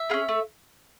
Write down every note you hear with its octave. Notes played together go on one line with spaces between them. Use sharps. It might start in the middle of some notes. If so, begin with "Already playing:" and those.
Already playing: E5
C#4 F4 G#4
A3